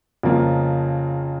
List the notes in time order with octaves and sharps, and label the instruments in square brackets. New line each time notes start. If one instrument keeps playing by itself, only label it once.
[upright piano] F2 C#3 F3 A#3 F4